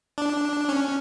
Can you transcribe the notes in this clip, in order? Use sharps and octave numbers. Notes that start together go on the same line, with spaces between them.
D4
C#4